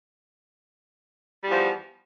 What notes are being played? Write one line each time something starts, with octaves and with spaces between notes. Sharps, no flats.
E2 F3 G3